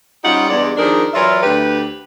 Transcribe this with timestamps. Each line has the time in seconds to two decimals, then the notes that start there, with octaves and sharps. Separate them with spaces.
0.24 G3 C#4 D#4 F4 G4 F#5
0.49 E2 G2 G#3 D5
0.77 D#3 F3 D4 D#4 G#4 A#4
1.14 E3 F#3 F4 A#4 D5 E5
1.43 D2 G4 B4